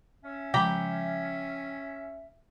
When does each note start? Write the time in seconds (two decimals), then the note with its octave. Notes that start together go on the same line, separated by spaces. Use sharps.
0.24 C#4 E5
0.54 C#3 F3 G#3 G4 A#5 B5